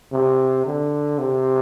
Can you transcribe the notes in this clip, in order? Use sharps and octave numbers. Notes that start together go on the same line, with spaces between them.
C3
D3
C3